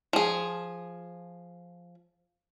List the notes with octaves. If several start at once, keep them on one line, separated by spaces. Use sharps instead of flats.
F3 G#4